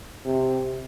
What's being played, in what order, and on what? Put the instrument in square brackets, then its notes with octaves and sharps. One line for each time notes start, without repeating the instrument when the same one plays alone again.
[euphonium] C3